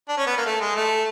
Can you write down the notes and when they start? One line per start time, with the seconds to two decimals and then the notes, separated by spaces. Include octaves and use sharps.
0.09 D4
0.17 C#4
0.27 B3
0.37 A#3
0.46 A3
0.61 G#3
0.75 A3